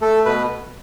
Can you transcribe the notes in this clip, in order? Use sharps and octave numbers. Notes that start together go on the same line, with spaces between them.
A3 A4
B2 B4